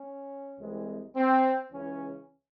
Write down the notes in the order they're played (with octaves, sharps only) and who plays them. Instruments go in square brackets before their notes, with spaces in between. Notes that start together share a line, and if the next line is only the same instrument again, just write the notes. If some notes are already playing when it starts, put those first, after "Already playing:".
Already playing: [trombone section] C#4
C2 C3 E3 G#3
C4
C#2 C#3 E3 C#4